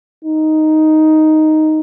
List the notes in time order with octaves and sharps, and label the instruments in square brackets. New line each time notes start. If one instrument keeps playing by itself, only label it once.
[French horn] D#4